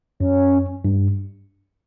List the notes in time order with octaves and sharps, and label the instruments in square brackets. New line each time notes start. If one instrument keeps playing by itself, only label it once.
[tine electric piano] F#2 [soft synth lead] C#4
[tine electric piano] G2